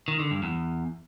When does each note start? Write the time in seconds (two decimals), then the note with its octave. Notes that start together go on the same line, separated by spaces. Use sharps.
0.08 D#3
0.19 D3
0.31 G2
0.43 E2